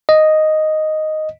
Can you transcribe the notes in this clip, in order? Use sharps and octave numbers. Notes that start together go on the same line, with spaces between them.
D#5